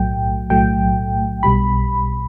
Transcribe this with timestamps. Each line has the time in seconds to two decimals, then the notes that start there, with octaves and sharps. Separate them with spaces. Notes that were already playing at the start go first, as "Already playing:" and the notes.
Already playing: B1 A2 F#3 A3 G5
0.50 B1 A2 F#3 A3 G5
1.43 B1 B2 G3 B5